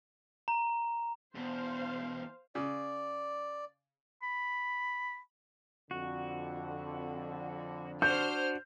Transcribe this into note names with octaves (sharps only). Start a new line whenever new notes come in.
A#5
E2 B2 C5 F5
C#3 D5
B5
F2 D3 F#4
D4 F#4 C5 F6 G6